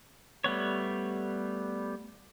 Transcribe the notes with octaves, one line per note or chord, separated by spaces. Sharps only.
G3 A3 B3 C#5